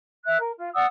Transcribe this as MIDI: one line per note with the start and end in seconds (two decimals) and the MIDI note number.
0.25 0.38 76
0.25 0.38 90
0.39 0.51 70
0.56 0.68 65
0.74 0.85 74
0.74 0.85 78
0.74 0.85 87
0.74 0.85 88